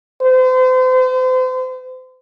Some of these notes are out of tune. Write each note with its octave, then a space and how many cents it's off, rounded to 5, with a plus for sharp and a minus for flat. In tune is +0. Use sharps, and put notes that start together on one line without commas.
C5 -35